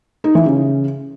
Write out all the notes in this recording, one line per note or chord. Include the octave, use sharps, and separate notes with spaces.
D#4
E3
C#3